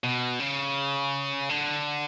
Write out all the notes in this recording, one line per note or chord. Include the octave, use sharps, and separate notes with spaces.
B2
C#3
D3